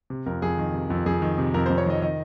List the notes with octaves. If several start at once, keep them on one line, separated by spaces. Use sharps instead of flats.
C3
F2 A#4
F2 G#4
D#3
C3
F2
F2 G#4
D#3
C3
F2 A#4
C5
F2
C#5
D#3 D#5
D#3 D#5